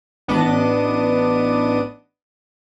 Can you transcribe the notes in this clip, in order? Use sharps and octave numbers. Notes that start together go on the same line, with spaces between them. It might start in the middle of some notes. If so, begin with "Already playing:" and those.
A1 B3 D4 D#5 D6 D#7